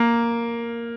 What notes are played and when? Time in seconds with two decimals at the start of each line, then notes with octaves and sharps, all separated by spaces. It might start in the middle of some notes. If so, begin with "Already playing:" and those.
Already playing: A#3